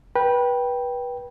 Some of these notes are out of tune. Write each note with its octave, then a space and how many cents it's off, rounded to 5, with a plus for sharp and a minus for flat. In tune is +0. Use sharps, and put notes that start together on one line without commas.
B4 -25 G5 +0